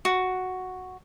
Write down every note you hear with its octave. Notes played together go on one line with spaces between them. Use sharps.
F#4